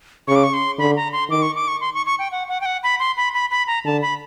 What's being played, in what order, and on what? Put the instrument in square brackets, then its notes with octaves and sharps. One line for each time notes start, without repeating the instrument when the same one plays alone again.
[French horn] C#3 [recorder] C#6
[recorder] D6
C#6
C6
[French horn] D3 [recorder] B5
[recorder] A#5
C6
[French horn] D#3 [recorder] D6
[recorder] C#6
D6
C#6
C6
C#6
C#6
G5
F#5
F#5
G5
F#5
B5
C6
B5
B5
B5
A#5
[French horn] D3 [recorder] A5
[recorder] B5